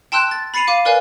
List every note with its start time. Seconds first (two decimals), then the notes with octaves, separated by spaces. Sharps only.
0.12 G5 A5 C6 E6 F#6 G6
0.31 A6
0.54 B5 A6 C7 C#7 D#7 F7
0.68 F5 D6 C7 D#7
0.85 A#4 B4 D5 F5 G#5